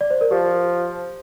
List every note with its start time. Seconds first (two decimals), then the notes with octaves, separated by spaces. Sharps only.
0.01 D5
0.10 C5
0.21 A#4
0.31 F3 G4